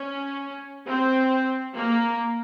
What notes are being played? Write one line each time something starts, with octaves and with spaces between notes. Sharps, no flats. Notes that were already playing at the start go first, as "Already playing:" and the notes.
Already playing: C#4
C4
A#3